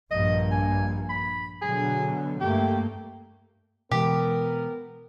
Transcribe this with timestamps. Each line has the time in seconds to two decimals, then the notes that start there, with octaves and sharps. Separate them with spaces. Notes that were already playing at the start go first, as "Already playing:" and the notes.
0.11 A#1 G2 A#3 D#5
0.51 G#5
1.09 B5
1.62 B2 D3 F#3 G#4
2.40 G2 A3 A#3 G4
3.91 B2 E3 G#3 B3 G4 A#4